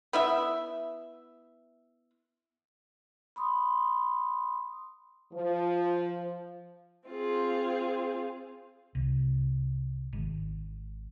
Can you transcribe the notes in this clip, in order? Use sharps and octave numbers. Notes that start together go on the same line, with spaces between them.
B3 E4 E5
B5 C6 D#6
F3
C4 F4 G#4
C2
G#1